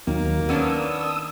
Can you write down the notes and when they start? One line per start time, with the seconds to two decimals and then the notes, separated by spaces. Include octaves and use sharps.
0.07 D#2 D#3 F#3 A#3
0.49 B3 C#4 D4 D#6 E6